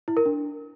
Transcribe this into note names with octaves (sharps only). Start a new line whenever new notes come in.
E4
A#4
D4